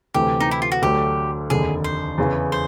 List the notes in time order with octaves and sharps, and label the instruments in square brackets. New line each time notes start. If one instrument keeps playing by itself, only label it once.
[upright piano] D2 C3 E3 A3 [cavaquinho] G4
[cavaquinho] D#4
E4
F4
F#4
[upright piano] D2 D3 F#3 A3 [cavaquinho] G4
[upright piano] F1 D#2 D3 [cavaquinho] G#4
[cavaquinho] C5
[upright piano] E2 C#3 E3
[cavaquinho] C5